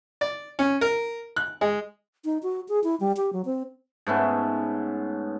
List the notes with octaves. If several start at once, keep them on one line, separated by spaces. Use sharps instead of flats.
D5
C#4
A#4
F#6
G#3
D#4
F#4
G#4
E4
G3
G4
F#3
C4
G#2 A3 B3 C#4